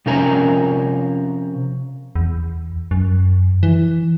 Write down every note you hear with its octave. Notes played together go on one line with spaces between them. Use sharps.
C3 F3 C#4 A#4 G#5 A#5
E2
F#2
E3